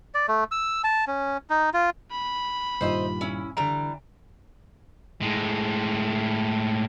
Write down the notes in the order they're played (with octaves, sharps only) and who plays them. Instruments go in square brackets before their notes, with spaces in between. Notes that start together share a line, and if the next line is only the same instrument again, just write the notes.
[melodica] D5
A3
E6
A5
C#4
D#4
F4
[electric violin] B5
[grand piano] G2 A#2 D#3 [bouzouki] C5 D#5 E5
[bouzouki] C#4 E4
[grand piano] D3 D7 [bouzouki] E3 G3 A#5
[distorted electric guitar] A2 G#3